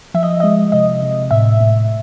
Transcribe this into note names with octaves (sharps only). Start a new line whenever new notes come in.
F3 E5
D#5
G#3 D#5
C3 D#5
C3
A2 E5
A2